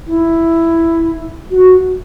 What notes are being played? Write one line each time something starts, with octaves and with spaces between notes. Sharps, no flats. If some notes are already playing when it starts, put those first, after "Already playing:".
E4
F#4